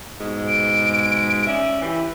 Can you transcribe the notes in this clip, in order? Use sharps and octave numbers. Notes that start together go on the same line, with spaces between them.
G#2 B2 G#3
D7
C#4 D5 E5
E3 E4 G4